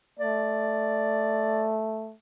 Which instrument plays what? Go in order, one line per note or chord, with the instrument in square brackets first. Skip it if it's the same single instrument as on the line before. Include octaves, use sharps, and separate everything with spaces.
[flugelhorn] A3 [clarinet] D5